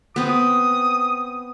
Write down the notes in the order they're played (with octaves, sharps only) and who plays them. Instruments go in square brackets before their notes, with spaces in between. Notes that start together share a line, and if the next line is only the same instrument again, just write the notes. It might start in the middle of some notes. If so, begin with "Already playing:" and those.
[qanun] B3 C4 [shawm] D#6